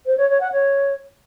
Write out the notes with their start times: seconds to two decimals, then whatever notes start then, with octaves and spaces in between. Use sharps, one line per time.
0.06 C5
0.17 C#5
0.29 C#5
0.40 F#5
0.52 C#5